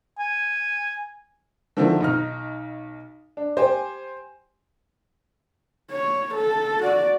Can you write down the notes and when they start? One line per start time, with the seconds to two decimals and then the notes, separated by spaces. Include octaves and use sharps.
0.19 G#5
1.77 D3 D#3 F3 C4 E4 A4
2.00 B1 D#4 F6
3.37 D4
3.57 G4 C5 G5 G#5
5.91 C#5
6.34 A4
6.83 F#4 D5